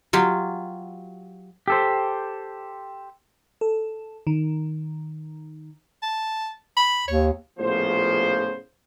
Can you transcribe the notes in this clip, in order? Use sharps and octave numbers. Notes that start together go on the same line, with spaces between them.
F#3 F4 G4
G4 A4 C5
A4
D#3
A5
B5
D#2 C#5
A#1 A2 C#3 F3 B3 C5